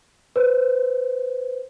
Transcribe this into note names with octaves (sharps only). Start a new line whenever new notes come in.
B4 C5